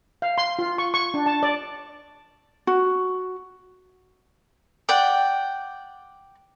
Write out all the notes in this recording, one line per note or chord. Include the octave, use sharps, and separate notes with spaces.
F5
C6
F4
C#6
C#6
D4
A5
D5
F#4
D5 F#5 G5